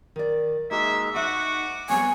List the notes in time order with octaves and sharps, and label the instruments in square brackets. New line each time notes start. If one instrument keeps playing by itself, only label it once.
[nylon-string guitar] D#3 D5
[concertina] G#3 A#3 D#4 [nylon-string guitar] F#4 [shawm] E5
[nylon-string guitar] D#4 C5 E5 [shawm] F#4 [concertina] F#5 D6
[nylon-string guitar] G3 B3 C4 [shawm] C#5 [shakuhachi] G#5